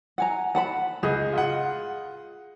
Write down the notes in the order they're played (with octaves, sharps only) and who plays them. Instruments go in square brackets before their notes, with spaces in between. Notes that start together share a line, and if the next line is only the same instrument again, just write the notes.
[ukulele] F#5 G#5 A#5
F#5 A5 B5
[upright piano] C#2 D#5 [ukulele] G#4
[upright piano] F4 D#5 F#5